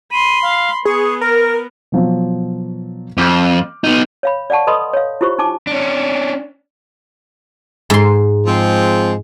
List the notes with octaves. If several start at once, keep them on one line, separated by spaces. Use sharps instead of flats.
B5 C6 D#7
F5
B3 G#4 C#6
A#4 A#6
B2 F3 F#3
F2 D6 F6 G6
B3 D#4
C#5 F5 B5
D5 F5 F#5 A5 C#6
A4 B4 D#5 B5 C6 D#6
C#5 F5
E4 F4 G4 C5 C#6
D#4 G#5 A5 D6
C#4 D4
G#2 C6
F3 G#3 C4